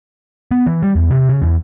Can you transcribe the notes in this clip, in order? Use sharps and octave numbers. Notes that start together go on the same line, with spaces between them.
B3
E3
G3
E2
C3
C#3
E2